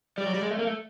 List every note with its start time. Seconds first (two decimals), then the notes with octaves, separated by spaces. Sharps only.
0.18 G3 D5
0.27 F#3
0.34 G3
0.42 G#3
0.51 A3
0.59 A#3
0.67 A3